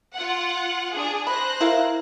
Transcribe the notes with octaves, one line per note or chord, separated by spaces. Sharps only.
F4 F#5
D4 G#4
C5 B5 F#6 A#6
E4 A#4 F5